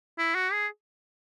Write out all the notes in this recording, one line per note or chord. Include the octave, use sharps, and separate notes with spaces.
E4
F#4
G#4